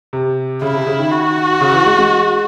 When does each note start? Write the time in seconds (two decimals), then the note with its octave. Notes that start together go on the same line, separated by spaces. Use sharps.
0.13 C3
0.62 C#3 E4
0.74 C3
0.87 C#3
0.99 D#3
1.11 F#4
1.61 C#3
1.73 E3
1.86 G#3
1.98 G#3